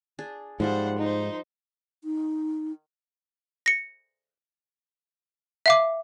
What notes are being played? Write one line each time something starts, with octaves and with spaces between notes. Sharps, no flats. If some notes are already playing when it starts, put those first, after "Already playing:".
D4 G#4
G#2 F3 G3 F4 C5 F#5
D#4 C5
D#4
A#6 C#7
E5 F5 D6